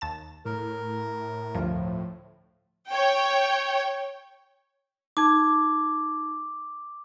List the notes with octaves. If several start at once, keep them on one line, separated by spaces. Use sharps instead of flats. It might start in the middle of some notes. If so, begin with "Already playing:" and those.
D#2 A5 E7
A2 A#4
D2 G2 F3
C#5 G5
D#4 A5 D6 G#6